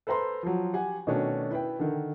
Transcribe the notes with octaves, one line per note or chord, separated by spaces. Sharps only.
A4 B4 C5 A#5 C6
F3 F#3
G4 F#5 G#5
B2 D#3 A3 C#4 D4
E4 B4 G5
D3 D#3